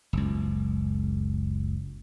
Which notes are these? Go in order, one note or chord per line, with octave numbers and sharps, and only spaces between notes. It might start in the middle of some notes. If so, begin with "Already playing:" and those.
F#1 C#2